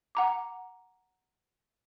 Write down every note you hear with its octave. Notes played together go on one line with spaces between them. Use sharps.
F#5 A#5 D6